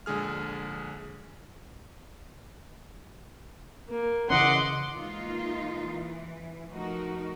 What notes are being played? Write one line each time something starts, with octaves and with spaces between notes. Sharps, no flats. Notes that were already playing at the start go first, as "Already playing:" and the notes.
A#1 D3 G#3 G#4 F6
A#3
C#3 E3 C#4 D#5 F#5 C6 D6
E3 G#3 A#3 D#4 F4
E3
F3 A3 D#4 F#4 A#4